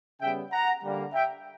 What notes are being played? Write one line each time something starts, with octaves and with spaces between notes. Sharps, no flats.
C#3 G3 B3 E5 G5
F#5 A#5
D3 G3 A#3
E5 G5